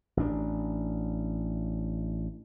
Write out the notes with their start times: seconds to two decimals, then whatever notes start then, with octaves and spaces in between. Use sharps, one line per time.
0.17 A1 D4